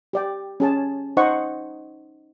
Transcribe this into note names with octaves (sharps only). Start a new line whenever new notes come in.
G4 D5 G5
C#4 G#4 A5
D#4 C5 D#5 F#5 C#6